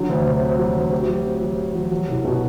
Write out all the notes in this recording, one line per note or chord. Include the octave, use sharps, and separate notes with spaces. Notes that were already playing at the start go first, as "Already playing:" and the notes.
Already playing: D3 F#3
D2
C3
C4
F#3
D2
G4
F#3
C4
F#3
G4
F#3
F#3
C2
B2